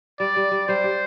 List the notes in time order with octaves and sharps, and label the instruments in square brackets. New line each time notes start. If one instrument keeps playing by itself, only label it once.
[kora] G3 [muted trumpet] D5
[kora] G3
G3
[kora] G3 [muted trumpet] C5
[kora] G4